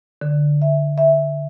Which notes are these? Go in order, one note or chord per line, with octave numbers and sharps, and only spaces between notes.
D3
E5
E5